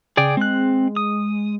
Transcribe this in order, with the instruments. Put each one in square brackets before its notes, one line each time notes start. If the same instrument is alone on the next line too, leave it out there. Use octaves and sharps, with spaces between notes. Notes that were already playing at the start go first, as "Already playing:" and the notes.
[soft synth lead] C#3 [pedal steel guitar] G#4 D5 G5
[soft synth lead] G#3 [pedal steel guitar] C4 F#6
[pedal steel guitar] D#6